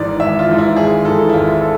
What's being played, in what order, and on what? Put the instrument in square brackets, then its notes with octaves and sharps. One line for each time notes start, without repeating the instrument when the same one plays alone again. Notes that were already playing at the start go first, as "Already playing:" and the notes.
Already playing: [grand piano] G#1 G#2 E3 D5
G#1 E5
F4
G#2 E3
E4
G#1 G#4
G#2 E3 A4
E4
G#1 F4
A4